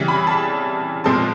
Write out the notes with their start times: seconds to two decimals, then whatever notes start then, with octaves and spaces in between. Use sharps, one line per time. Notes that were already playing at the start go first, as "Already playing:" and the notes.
Already playing: C#3 E3 G3
0.08 B5
0.27 A5
1.04 A#2 F3 G#3 A5